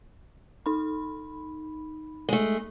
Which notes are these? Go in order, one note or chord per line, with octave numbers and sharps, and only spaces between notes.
D#4 B5
G#3 A3